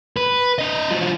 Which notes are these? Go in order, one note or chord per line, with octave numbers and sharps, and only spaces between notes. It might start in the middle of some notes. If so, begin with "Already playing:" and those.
B4
D4 D#5
F#3 F4